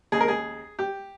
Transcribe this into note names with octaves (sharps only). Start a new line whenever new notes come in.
D#2 C#3 G#3 G#4
A#4
G#4
G4